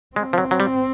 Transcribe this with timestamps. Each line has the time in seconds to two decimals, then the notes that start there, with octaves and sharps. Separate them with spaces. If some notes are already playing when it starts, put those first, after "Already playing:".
0.16 G#3 C4
0.33 F3
0.38 F#3
0.51 F#3
0.60 G3